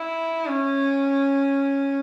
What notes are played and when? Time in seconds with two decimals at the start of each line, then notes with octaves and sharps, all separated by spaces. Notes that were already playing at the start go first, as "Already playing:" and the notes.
Already playing: E4
0.47 C#4